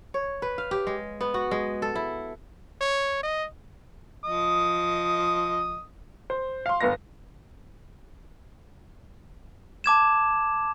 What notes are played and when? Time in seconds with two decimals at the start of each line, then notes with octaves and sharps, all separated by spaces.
0.14 C#5
0.42 B4
0.58 F5
0.71 G4
0.87 G#3
1.21 B3
1.34 F#4
1.51 G#3
1.82 A4
1.95 E4
2.81 C#5
3.23 D#5
4.24 F3 D#5 D#6
6.30 C5
6.66 F5 C6
6.80 G1 B3 F5 A#6
9.84 A5 D6 G#6 E7